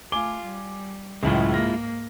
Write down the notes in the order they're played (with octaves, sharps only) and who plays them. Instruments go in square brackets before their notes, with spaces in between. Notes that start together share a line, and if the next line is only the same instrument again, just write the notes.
[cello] A3 F4 [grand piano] G#5 D6 G7
[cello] G3
[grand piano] C#2 F#2 A2 [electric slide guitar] G#3 E4 F4
[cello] G#2 A#3 [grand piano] F6 A#6